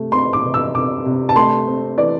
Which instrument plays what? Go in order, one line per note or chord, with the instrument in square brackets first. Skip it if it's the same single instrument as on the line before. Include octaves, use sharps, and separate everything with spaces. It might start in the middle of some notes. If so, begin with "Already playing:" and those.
Already playing: [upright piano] C3 A3
C4 C6
D6
C3
E6
C3 D6
C3
A5
A3 C6
C4
E3 D5